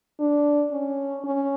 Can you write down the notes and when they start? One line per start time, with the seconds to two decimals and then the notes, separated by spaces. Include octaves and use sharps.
0.20 D4
0.72 C#4
1.24 C#4